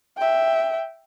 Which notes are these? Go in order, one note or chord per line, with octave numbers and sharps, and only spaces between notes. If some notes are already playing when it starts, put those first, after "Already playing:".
E5 G5